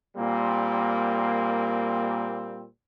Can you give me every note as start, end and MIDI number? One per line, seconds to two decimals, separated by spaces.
0.17 2.65 46
0.17 2.65 55
0.17 2.65 58
0.17 2.65 60